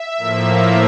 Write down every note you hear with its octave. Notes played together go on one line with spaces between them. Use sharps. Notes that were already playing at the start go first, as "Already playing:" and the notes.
Already playing: E5
A2 F3 A#3